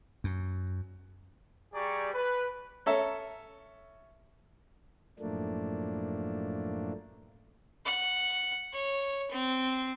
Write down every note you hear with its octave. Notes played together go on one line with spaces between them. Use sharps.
F#2
G3 G4 G#4 D5 A#5 C#6
B4
C#4 A4 E5 A#5
F#2 A2 F3 A3 A#3 D4
F#5
C#5
C4